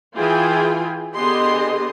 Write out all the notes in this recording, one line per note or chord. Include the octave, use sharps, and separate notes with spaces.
E3 E4 F4 G#4 G5 G#5
D3 B3 G4 G#4 D#5 C6